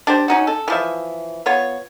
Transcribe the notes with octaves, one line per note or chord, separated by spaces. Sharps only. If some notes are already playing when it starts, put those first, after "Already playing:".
D4 G4 C5
C#4 D#4 F#4
A4
E3 F3 E5
B3 F4 C#5